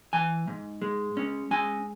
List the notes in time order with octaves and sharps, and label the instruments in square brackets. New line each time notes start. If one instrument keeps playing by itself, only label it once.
[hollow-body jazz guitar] E3 G#5
G#2
G#3
C#4
G#3 G#5